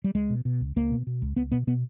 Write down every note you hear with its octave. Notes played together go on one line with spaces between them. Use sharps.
G3
C#2 G#3
B2
B2
C#2
C#2 A#3
B2
B2
C#2
C#2 B3
B2 B3
B2 B3